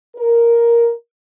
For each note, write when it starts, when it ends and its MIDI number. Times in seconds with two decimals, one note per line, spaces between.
0.16 0.92 70